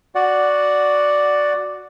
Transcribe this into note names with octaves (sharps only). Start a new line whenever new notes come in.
F#4 D5 F#5